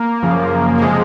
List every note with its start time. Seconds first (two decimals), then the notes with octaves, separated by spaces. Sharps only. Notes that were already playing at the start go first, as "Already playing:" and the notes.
Already playing: A#3
0.22 F#2 C#3 F3
0.78 A#3
0.82 C3 F3 G#3